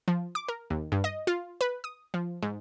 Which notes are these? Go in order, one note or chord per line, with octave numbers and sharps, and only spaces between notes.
F3
D6
A#4
D#2
G2
D#5
F4
B4
D#6
F3
G#2